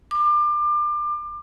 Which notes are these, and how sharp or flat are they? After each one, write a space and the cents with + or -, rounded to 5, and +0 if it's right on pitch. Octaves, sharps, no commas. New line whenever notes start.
D6 +30